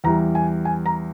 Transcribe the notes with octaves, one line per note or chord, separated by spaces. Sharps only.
E2 E3 G3 A#5
G#5
G#5
A#5